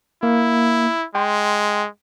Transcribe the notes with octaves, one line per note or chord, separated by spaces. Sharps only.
A#3 E4
G#3 G5 C6